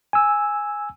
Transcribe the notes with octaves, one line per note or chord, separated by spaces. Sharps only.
G#5 E6